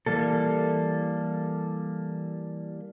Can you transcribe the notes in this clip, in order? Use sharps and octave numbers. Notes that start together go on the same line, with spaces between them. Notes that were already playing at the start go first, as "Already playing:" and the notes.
E3 G3 A#3 A4